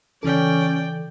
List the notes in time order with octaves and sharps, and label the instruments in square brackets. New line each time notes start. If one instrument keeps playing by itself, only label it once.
[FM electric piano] C#3 E3 A4 [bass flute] C#4 [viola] D5 G5